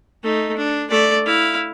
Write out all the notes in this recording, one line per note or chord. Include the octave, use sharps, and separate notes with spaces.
A3 D#4
D4
A3 D5
E4 F5